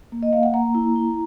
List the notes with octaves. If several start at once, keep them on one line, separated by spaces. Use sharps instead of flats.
A#3
D#5
A#3 F5
F#5
A#3 A#5
E4
E4